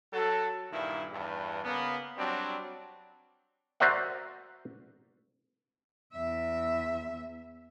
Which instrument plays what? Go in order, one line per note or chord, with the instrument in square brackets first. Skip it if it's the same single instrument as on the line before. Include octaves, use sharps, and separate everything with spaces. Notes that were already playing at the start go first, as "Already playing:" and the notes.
[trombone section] F#3 F#4 A4
G2 A#2 D#3 E4
E2 G2
C#3 A#3 B3
F#3 G3 C4 D4
[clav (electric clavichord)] F#4 A#4 C5 D5 E5 F#5
[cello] E2 E5